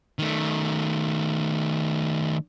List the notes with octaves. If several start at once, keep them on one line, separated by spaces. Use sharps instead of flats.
D#3 A3